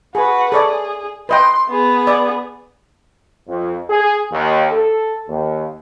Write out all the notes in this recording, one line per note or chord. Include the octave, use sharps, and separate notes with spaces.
F#4 G#4 B4
G#4 A4 C#5 D5
B4 D#5 G5 C6
B3 G#4
D5
F2
G#4
D#2
A4
D#2